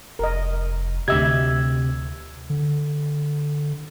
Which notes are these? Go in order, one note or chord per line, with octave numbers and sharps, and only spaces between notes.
F1 A#4 D#5
D2 C3 G4 D#5 E5 E6 G#6
D3